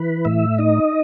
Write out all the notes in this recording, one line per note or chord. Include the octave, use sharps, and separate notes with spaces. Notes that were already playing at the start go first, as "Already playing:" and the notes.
Already playing: E3 B4
A2 E5
D#4 D#5